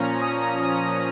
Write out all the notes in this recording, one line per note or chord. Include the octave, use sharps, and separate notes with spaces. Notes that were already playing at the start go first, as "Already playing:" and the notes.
Already playing: A#2 F3 C#4 A#5
D#6